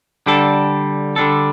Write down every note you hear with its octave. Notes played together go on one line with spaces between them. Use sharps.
D3 G3 D4 A4
D3 G3 D4 A4